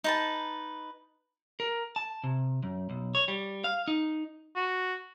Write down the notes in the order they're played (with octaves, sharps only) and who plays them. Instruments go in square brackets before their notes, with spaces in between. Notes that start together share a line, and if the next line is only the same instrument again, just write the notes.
[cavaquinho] D#4 B4 A5
[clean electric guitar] A#4
A5
C3
F#2
B1
C#5
G3
F5
D#4
[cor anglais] F#4